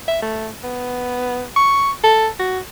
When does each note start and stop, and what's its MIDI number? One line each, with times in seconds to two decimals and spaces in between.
0.08 0.21 76
0.22 0.49 57
0.64 1.44 59
1.56 1.91 85
2.04 2.28 69
2.39 2.59 66